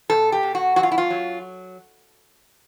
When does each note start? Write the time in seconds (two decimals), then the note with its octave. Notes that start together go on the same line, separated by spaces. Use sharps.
0.10 B2 A4
0.32 G4
0.43 B2
0.55 F#4
0.76 F#2 F#4
0.83 F4
0.92 E4
0.98 F4
1.10 F#3